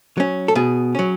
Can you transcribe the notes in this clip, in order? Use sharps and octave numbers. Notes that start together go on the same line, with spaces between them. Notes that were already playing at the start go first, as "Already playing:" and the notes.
F#3 C#4
A4
B2 G#4
F#3 C#4